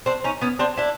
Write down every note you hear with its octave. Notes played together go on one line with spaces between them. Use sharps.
C4 D4
C#4 D#4
B3 C#4
C4 D4
D4 E4